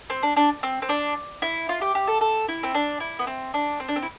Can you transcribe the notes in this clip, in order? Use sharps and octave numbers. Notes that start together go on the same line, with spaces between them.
C4
D4
D4
C4
C4
D4
E4
F4
G4
G4
A4
A4
E4
C4
D4
E4
B3
C4
D4
C4
D4
C4
E4